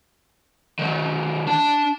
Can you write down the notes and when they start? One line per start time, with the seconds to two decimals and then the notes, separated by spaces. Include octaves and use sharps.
0.79 D#3 F#3
1.47 D4 A5